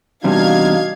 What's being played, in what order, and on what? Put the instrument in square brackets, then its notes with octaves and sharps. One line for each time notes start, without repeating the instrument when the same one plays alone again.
[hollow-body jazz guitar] E2 C3 G3 [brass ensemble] D4 D#4 F#4 [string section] F5 G#6